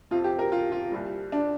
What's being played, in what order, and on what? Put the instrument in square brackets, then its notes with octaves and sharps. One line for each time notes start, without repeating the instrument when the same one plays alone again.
[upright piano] F2 C3 F3 C4 F4
G4
A#4
F4
F4
C2 A#2 G3
D4